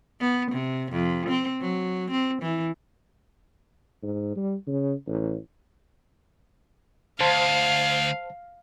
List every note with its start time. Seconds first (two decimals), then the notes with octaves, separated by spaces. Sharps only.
0.21 B3
0.52 C3
0.92 F2
1.29 C4
1.61 F#3
2.11 C4
2.42 E3
4.03 G#2
4.36 G3
4.67 C#3
5.07 A1
7.20 D2 C5 F5 A5